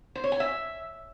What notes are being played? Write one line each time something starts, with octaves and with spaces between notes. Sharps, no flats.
C5
C#5
G#5
E5